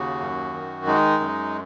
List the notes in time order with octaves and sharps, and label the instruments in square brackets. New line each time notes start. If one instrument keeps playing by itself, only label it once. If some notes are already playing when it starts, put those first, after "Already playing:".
Already playing: [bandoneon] D#2 C#3 F#4
F#2
D#3
G#3 D#4
F#2